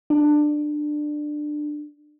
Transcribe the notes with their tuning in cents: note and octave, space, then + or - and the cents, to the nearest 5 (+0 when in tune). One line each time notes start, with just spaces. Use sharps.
D4 +20